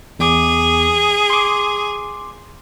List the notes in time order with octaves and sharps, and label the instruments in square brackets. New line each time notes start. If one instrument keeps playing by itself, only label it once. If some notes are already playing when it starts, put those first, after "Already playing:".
[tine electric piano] E2 D6 [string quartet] G#4
[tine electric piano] C6 D6